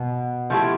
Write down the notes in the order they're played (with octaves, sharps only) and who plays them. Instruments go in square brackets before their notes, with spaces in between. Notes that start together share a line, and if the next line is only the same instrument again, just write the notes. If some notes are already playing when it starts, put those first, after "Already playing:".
Already playing: [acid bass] B2
[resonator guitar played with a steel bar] F3 A3 E4 G4